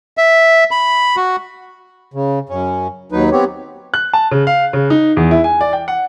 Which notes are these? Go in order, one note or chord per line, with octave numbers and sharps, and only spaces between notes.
E5
B5
F#4
C#3
F#2 C#4
D#2 F#3 D#4 B4
B3 C4 G4 C#5
F#6
A5
C#3
F5
C#3
D#4
E2
E4
G#5
D5
G5
F#5